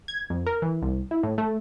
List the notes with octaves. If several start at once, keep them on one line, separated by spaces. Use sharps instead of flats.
G#6
F2
A#4
E3
C2
E4
A2
A3